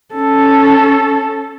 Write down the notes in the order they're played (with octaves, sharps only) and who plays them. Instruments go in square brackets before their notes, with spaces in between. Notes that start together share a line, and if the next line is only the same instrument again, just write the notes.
[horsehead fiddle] C#4 A4